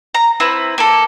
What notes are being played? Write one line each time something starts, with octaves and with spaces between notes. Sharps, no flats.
A#5
C4 E4 B4
A#3 A4